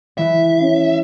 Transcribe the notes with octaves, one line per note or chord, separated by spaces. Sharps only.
E3 G#3 E5
C#4